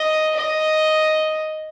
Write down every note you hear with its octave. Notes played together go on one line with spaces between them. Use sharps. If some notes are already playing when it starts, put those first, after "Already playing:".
Already playing: D#5
D#5